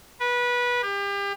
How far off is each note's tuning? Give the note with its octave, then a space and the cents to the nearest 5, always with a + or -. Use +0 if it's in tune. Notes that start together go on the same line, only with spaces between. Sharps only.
B4 -20
G4 +35